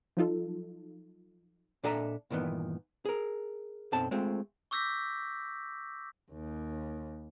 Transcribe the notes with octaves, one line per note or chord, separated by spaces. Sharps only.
F3 F#3 D#4 F4 A4
A#2 D4 A4 D#5 E5 A#5
G2 A#2 D#3 E3 B3
G#4 A#4
B1 F#2 C4 A4 A5
G#3 A3 C4 F4
C#6 D6 E6 G6 A#6 B6
D#2